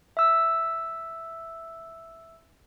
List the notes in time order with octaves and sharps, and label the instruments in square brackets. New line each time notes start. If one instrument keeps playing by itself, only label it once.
[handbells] E5 E6